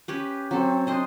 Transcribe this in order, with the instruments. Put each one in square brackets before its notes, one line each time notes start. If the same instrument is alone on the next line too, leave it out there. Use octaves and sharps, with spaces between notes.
[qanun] C#4 G4 B4
[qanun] F#3 A4 [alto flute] C4
[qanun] D4 C5 D#5